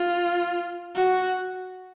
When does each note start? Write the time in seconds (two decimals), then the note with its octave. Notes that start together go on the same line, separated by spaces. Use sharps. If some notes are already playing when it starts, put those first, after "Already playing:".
Already playing: F4
0.96 F#4